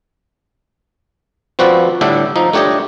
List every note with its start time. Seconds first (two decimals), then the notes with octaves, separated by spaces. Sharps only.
1.59 F3 C4 F#4 B4 D5
2.01 A2 D3 G3 D4 E5
2.36 F3 D#4
2.53 A3 D4 G4 C#5 D#5